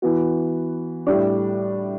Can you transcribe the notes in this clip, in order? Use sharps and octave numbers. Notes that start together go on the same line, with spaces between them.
E3 B3 F#4
A2 G3 D4